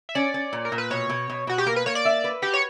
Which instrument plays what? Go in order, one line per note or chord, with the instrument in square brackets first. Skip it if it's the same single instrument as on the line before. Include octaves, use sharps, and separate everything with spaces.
[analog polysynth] E5
[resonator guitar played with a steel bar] C#4 [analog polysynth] D5
[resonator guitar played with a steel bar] C#4
A#2
[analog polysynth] A#4
[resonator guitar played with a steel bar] A#2
[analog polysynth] B4
[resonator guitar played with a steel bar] B2 [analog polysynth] C#5
[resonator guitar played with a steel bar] B2
B2
[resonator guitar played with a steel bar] B2 [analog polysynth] F#4
[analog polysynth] G4
[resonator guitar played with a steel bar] A#3 [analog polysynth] A#4
[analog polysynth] B4
[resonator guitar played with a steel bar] A#3 [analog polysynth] C#5
[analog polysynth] D5
[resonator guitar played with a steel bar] E5
B4
[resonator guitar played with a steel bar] F#4 [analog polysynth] G4
[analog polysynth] C#5